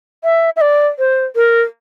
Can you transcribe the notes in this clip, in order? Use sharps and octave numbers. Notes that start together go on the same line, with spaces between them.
E5
E5
D5
C5
A#4